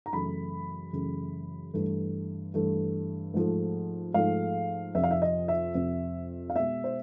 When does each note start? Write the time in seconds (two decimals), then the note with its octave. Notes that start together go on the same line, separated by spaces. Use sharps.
0.06 A#5
0.13 F#2 C#3 E3 A3 B5
0.93 F#2 C#3 E3 A3
1.74 G2 E3 A3
2.54 G2 E3 A3
3.34 G#2 F3 A3
4.14 G#2 F3 A3 F5
4.95 F2 C3 F3 E5
5.04 F5
5.11 E5
5.22 D#5
5.48 E5
5.75 F2 C3 F3
6.50 F5
6.56 B2 G#3 E5
6.84 C5